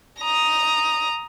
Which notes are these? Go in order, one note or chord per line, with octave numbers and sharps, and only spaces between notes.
A#5 D#6